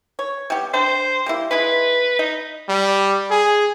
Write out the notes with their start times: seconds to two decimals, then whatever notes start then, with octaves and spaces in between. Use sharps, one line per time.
0.19 C#5
0.50 G3 B3 G4
0.74 D4 C5 G5
1.26 G3 A#3 E4
1.51 G#3 E4 B4 C6
2.19 D#4 D#5
2.69 G3
3.31 G#4